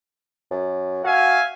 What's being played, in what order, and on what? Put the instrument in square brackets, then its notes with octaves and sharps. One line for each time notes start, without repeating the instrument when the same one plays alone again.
[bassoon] F#2
[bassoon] F#4 [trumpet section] E5 F5 G#5